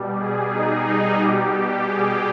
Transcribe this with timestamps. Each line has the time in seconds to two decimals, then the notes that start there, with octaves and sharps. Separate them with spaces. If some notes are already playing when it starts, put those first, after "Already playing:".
Already playing: B2 G3
0.20 G#4
0.53 D#4
0.86 D#4
1.19 B2 G3 G4
1.87 G#4